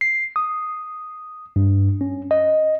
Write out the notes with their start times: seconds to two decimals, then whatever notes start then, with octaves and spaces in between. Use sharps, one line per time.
0.01 C7
0.36 D#6
1.56 G2
2.01 C#4
2.31 D#5